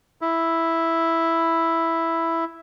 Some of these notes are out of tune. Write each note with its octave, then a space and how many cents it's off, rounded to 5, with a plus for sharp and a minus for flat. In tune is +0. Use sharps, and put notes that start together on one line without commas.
E4 +0